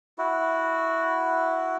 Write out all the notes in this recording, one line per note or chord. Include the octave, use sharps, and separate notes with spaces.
E4 F#4